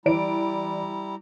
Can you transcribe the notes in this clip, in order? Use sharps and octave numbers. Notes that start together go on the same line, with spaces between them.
E3 G3 E4 D5 A#5 D7